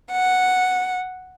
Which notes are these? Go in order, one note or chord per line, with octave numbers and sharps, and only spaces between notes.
F#5